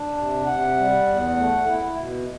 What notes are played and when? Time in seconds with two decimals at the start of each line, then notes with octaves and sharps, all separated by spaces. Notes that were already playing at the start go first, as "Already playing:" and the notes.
Already playing: D4
0.16 C3
0.46 C3 F#5
0.77 G3
1.07 E2
1.37 A3
1.67 E4
1.97 B2